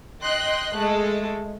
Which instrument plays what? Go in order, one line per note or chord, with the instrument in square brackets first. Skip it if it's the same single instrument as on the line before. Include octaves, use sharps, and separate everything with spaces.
[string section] D#5 G5 C6 F#6
G#3 A3 A4